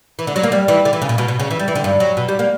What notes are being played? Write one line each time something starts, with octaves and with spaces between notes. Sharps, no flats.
E3
D3
F#3
A#3
G3
E3
D3
E3
C#3
A#2
B2
B2
C#3
E3
G3
E3
D3
G2
F#3
B2
G3
A#3